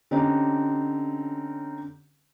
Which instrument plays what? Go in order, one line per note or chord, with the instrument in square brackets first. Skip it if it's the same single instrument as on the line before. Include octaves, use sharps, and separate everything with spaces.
[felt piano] D3 C4 C#4 D#4 G4